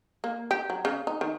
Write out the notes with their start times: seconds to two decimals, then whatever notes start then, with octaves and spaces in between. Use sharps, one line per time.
0.24 A#3
0.51 G4
0.70 F#3
0.85 C#3
1.07 D#4
1.21 D#3